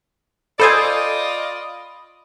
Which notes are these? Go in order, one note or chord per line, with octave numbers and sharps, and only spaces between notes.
F4 A4 C5 D5 D#5 G#5 B5 D#6